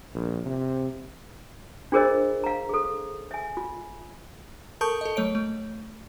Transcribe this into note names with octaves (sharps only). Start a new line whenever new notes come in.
A#1
C3
D4 F4 G#4 A#4 C5 D#5
F5 A#5
G#4 A4
E5 G#5
F4
A4 A#4 A5 C#6 D#6 G6
A4 D#5
F#3 A3 C#5 D7
A3